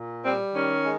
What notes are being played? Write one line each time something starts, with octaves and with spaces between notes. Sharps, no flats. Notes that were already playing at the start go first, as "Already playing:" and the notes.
Already playing: A#2
G3 C4
D#3 C#4
G#3